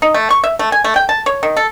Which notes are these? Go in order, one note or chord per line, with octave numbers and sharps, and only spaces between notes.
D#4
A3
C#6
E5
A3
G#5
A3
G5
A5
C#5
D#3
A4